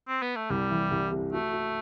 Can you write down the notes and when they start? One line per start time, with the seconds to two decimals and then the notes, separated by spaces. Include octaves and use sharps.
0.08 C4
0.22 B3
0.36 A3
0.50 C2 G3
0.71 E3
0.91 C2
1.12 C3
1.32 A3 F#4
1.53 F#4